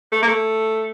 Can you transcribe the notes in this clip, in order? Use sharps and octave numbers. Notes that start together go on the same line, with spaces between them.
A3
A#3
A3